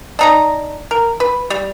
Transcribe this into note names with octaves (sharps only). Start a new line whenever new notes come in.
D4 D#4 A#5
A#4
B4
G3